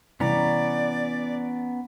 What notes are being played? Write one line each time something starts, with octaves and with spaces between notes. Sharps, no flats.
C3 E3 G3 B3 C#4 D5 A#5